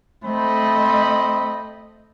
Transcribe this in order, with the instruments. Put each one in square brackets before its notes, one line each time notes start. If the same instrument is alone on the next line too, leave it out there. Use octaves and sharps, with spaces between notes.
[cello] A3 D#5 [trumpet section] C4 C5 B5